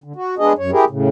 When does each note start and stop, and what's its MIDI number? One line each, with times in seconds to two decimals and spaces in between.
0.04 0.13 50
0.16 0.35 66
0.39 0.53 56
0.39 0.53 59
0.39 0.53 62
0.39 0.53 68
0.39 0.53 75
0.58 0.71 42
0.58 0.71 73
0.72 0.85 64
0.72 0.85 67
0.72 0.85 68
0.72 0.85 70
0.90 1.09 45
0.90 1.09 49